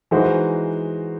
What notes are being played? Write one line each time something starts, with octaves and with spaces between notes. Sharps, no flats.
E3 G#3 D#4 F#4 C5